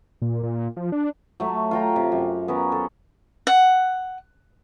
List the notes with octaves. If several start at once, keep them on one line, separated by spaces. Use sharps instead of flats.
A#2
A#2
F3
D4
F#3 A3 E5
F4 G5 A#5
C3
F#2
B3 C#4 A#4
A4
F#5